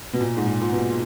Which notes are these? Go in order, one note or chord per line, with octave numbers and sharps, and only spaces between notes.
B2
A#2
G#2
A#2
A#2
B2